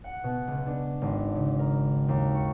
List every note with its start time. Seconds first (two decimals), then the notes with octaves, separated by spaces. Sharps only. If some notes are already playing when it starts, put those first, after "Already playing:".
0.04 F#5
0.24 B2
0.47 C#2
0.66 D4
1.02 G#1
1.35 C#3
1.59 A#4
2.08 D#2
2.35 C#6